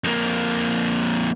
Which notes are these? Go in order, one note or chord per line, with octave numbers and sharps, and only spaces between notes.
F2 A#3